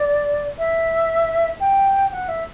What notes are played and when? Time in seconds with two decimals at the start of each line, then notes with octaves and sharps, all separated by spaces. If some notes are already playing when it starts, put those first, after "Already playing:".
Already playing: D5
0.59 E5
1.60 G5
2.12 F#5
2.29 E5